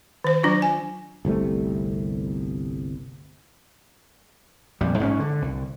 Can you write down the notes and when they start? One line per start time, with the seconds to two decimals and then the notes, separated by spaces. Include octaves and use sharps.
0.24 D#3 C5
0.43 F#3 D4 F4
0.62 G#5
1.25 G1 C2 C3 A3
4.81 A#1 F2 G3
5.00 G#2 B3 C#4
5.20 D3
5.42 C2